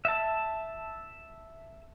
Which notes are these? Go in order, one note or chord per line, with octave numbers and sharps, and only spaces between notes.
E5 A5